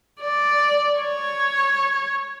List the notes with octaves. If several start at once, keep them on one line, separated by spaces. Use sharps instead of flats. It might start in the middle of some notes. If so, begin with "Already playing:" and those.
D5
C#5